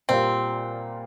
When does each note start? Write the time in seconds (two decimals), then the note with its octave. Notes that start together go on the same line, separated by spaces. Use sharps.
0.09 A#2 G3 A#3 C4 F4